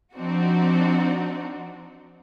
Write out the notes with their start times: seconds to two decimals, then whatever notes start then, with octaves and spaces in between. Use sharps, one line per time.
0.15 F3 C4 D4 D#4 F#4